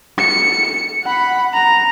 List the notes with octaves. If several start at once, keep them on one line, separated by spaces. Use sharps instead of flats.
C#7
F#5 B5
A#5